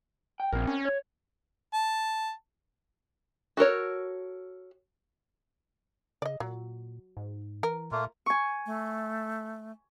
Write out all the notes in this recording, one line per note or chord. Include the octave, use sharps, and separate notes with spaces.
G5
A#1 C4 A#4
C#4
C#5
A5
F#4 A4 A#4 C#5
C#3 D5 D#5
A#2 F#3
G#2
E3 A#4
A#2 A3 A#3 F4
G#5 C#6
A3